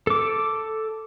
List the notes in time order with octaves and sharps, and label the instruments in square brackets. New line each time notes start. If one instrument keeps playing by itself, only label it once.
[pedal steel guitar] A4 D6